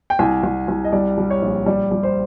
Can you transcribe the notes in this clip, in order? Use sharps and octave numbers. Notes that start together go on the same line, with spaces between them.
G5
C2 G#5
C2
C2
D#5
G3 D5
G3
C#5
A#1
G3 D5
G3
C5